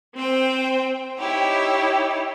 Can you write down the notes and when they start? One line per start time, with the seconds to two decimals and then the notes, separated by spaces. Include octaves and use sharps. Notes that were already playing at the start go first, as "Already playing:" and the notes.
0.15 C4 C5 G5
1.19 D#4 E4 G4 C#5